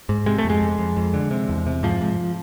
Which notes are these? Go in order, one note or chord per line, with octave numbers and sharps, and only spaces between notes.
G#2
C3 G#3
A3
F2
G#3
F2
F2
F2
D3
C3
E2
C3
G#2 F3
G#2